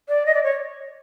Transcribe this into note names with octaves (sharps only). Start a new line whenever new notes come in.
D5
D#5
D5
C#5